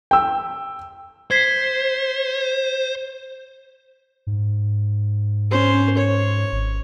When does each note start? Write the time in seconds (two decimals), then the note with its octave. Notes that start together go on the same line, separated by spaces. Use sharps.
0.11 G5 E6
1.31 C5 G#6 B6 C7
4.27 G#2
5.51 C#4 C5
5.98 C#5
6.52 G#1